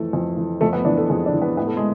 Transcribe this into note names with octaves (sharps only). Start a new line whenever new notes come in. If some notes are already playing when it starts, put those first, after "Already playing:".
Already playing: F2 E3 A3
F2
E3
F2 A3
B3
E3 D4
A4
F2 G#4
D4
E3
B3
A2 B3
A3
G#3